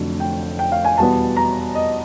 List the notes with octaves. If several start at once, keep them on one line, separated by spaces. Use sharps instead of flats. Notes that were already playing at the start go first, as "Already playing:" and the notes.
Already playing: F1 F2 D3 F#3 A3
G5
G5
F5
G#5
E2 B2 G3 B3 A5
A#5
D#5